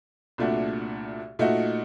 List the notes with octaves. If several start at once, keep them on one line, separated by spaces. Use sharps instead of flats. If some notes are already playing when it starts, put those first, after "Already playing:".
C2 A#2 A3 D4 F#4
A#2 A3 D#4 F#4